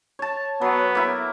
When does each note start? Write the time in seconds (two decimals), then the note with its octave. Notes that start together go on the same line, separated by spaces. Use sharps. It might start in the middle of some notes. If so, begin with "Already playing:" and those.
0.19 C#5 A5
0.61 F#3 B3
0.95 A#3 E4